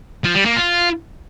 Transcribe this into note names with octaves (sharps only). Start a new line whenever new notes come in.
F3
G3
A#3
F4